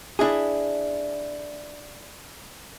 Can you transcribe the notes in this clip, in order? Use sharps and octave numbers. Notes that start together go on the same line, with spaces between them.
D4 E4 G#4